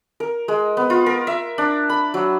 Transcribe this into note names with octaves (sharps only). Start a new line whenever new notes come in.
A#4
G#3
B3
F4
A#4
E5
D4
B5
F#3